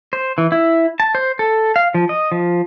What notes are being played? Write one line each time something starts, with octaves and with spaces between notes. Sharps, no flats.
C5
E3
E4
A5
C5
A4
F5
F3
D#5
F3